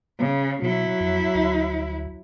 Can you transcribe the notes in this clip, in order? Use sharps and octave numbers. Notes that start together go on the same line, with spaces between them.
C#3
B2 F#3 E4
F2
D2